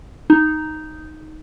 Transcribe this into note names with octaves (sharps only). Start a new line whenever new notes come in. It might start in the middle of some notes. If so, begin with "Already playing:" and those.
D#4